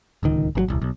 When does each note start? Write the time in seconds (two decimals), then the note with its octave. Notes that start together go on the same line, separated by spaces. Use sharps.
0.23 D1 C#2 D#3
0.55 G#1 D3 F#3
0.68 D#1 C2
0.82 B1